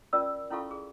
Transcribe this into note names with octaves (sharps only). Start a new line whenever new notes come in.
C#4 F4 A#4 D5 E6
C#4 E4 F4 A4 F5 C#6
G#4